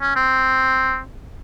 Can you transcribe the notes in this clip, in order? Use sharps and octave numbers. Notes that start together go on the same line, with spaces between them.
C#4
C4